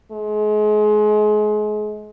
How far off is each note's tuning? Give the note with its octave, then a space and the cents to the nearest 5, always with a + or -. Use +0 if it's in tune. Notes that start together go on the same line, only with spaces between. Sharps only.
G#3 +30